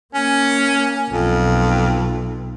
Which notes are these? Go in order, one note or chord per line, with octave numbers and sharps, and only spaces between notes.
A#3 C#4
B1 F2